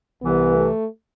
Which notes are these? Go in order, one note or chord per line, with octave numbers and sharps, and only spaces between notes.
C2 C3 E3 B3
A3